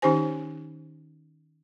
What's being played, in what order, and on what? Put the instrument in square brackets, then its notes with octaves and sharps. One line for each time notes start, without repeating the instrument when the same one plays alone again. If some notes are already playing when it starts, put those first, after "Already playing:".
[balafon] D#3 C#4 D#4 G4 C5 G#5